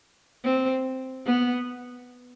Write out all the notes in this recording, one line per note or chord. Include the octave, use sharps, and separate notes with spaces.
C4
B3